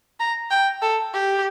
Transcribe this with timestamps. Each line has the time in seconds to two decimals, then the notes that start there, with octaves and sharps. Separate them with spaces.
0.20 A#5
0.51 G5
0.82 A4
1.13 G4